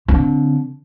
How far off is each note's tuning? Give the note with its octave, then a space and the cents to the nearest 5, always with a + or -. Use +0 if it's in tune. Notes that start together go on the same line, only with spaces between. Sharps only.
D3 -20 C4 -25